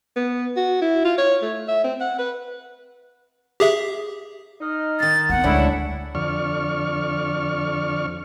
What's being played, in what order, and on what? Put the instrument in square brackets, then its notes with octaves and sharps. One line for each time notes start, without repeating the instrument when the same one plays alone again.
[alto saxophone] B3
F#4
E4
F4
C#5
A3
E5
C4
F#5
B4
[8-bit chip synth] G4 G#4 E5
[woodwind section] D#4 D#5 F6
[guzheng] D#3 C6 [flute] A6
[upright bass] A#3 B3 [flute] F#5
[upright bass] D2 G#3 [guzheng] D3 G3 D4 [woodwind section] C#4 E4
[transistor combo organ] F2 D3 D5 C#6 F6